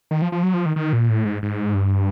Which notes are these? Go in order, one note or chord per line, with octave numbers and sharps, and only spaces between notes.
D#3
F3
F3
F#3
F3
D#3
D#3
A#2
A2
G#2
G#2
G2